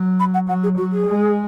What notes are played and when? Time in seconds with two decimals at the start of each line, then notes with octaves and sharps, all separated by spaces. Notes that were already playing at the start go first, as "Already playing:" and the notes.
Already playing: F#3
0.20 B5
0.34 F#5
0.48 F#3 F#5
0.63 G#4
0.77 F#3 F#4
0.92 G#4
1.06 G#3